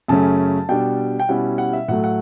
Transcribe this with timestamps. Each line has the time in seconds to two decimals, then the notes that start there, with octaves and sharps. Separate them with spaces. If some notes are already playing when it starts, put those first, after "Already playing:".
0.08 F#2 C#3 F#3 A3 C#4 A5
0.69 B2 G3 D4 G5
1.20 G5
1.29 B2 G3 C#4 E4 F#5
1.58 F#5
1.73 E5
1.88 A2 F#3 A3 F#5
2.04 F#5